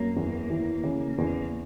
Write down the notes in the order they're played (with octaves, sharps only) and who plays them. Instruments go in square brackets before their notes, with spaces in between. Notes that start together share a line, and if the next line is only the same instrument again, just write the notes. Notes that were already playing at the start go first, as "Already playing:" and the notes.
Already playing: [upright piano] F#2 [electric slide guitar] A#3
[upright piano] E2
E3
C#3
E2